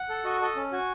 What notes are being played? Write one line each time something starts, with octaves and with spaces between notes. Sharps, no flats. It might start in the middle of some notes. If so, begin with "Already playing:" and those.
Already playing: F#5
A4
F#4 D#5
A4 D#5
C#4
F#4 G#5